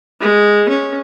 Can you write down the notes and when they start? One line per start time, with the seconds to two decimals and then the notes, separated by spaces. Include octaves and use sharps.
0.21 G#3
0.69 C#4